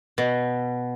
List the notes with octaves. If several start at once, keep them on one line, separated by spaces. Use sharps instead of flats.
B2